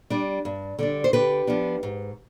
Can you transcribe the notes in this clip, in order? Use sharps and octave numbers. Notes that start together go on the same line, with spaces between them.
G3 D4
G2
D3 G3 D4
C5
D3 G4 B4
F3 B3 D4
G#2